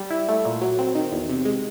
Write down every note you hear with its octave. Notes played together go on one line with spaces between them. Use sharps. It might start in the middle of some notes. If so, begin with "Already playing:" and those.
Already playing: G3
E4
A3
A#2
F#3
C4
D#3
E2
C3
G#3